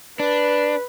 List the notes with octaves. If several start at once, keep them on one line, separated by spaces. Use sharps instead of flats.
D4 B4